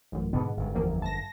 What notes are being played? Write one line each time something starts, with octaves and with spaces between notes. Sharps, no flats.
A1 F#2
G#2 B2 D3 B3
G1 F#2
E2 F3 A#3
A5 A#6